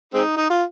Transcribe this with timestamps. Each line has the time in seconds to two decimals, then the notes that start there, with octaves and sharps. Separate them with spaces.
0.14 G#3 C4 D#4
0.37 D#4
0.50 F4